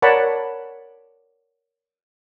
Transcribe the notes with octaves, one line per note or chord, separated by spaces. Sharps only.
A#4 C#5 D5 F#5 A5 B5